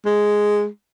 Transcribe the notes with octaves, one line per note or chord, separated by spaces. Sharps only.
G#3